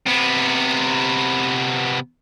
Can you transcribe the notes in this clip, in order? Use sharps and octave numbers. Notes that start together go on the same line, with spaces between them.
C3 B3